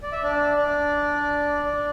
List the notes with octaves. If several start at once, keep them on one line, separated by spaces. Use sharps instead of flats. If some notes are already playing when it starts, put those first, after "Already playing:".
D5
E5
D4 D5
D4 D5
D4 D5